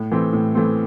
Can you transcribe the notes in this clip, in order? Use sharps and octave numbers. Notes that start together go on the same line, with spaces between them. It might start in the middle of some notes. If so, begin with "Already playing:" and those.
Already playing: A2
E3 A3 C4
A2
E3 A3 C4